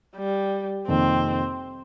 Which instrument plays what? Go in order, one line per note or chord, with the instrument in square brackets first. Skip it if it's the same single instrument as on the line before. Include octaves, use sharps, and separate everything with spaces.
[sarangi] G3
[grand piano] F2 C3 D#3 A#3 [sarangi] C4